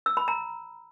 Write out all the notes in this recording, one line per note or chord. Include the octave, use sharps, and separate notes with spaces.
E6
B5
A#5